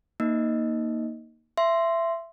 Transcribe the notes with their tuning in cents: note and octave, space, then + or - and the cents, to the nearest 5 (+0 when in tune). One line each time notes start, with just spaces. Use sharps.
A#3 +0 D#4 +0 D#5 +0
E5 +20 C6 +0